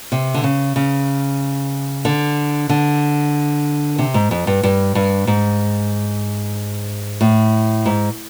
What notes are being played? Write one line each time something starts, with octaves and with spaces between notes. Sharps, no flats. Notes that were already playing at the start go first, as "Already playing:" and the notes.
C3
D3
C#3
C#3
D3
D3
C3
G#2
F2
G2
G2
G2
G#2
A2
G#2